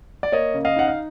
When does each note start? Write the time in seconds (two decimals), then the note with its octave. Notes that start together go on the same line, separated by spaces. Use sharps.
0.23 D5
0.32 A#3 C#5 D#5
0.54 C#3
0.65 D#5 F5
0.76 D#4 F#5
0.88 F5